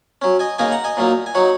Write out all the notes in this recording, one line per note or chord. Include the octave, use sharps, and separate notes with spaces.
F#3 C#4
D#5 G#5
C#3 A#3 D#4 D#5 G#5
F#5 A#5
D#5 G#5
A#2 F#3 A#3 D#4
G#5
F#3 D#4 C#5 F#5